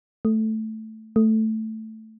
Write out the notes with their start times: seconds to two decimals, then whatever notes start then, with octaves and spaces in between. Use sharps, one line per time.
0.25 A3
1.16 A3